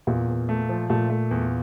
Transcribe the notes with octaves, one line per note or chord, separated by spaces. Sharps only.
E2 A#2
E2
A3
F3
A#2 A3
A3
E2